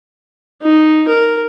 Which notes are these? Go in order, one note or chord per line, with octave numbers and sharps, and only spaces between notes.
D#4
A#4